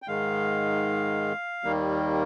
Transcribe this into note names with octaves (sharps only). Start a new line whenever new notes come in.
G5
G#2 D#3 G#3 F5
D#2 D#3 G3 A#3